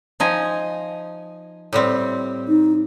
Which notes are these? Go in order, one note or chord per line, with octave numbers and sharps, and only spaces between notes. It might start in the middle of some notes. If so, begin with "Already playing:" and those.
F3 D#4 G#5
A2 G3 C4
D#4